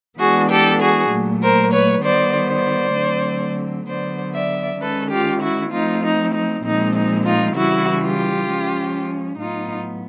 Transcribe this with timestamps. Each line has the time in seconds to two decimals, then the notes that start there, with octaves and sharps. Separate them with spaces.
0.19 E3 G#3 B3 D4 F#4 G#4
0.50 G4 A4
0.81 F#4 G#4
1.12 A#2 F#3 A3
1.42 A#4 C5
1.72 B4 C#5
2.04 D#3 G3 B3 C5 D5
2.50 C5 D5
2.95 D3 F#3 A3 C4
3.88 D3 F#3 B3 C5 D5
4.34 D5 E5
4.80 D#3 G#3 C#4 A4 B4
5.10 F4 G4
5.42 E4 F#4
5.72 F3 A3 C4 D#4 F4
6.03 D#4
6.34 D#4
6.65 A#2 F3 G#3 C4 D#4
6.95 D#4
7.26 D#4 F4
7.56 C#3 E3 G3 E4 F#4
8.03 F4 G4
8.49 F3 G#3 C#4
9.40 A2 F#3 B3 D#4 F4